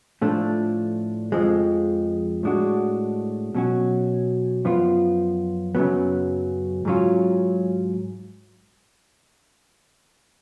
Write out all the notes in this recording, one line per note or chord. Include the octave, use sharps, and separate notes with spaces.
A2 F3 A3 D4 F4
F2 F3 G#3
A2 G#3 D4 F#4
B2 F#3 C#4 F#4
F#2 F3 B3 F4
F#2 C#3 F#3 B3
G#2 F#3 C#4 F4